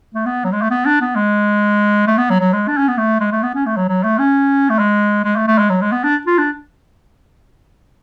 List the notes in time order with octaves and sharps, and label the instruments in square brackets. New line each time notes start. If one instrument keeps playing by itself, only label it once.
[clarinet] A3
B3
F#3
G#3
A3
B3
D4
B3
G#3
A3
B3
F#3
F#3
G#3
D4
C#4
B3
A3
G#3
A3
B3
C#4
A3
F#3
F#3
A3
C#4
A3
G#3
G#3
A3
A3
G#3
F#3
G#3
B3
D4
F4
D4